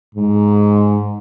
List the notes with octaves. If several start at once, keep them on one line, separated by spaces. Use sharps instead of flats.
G#2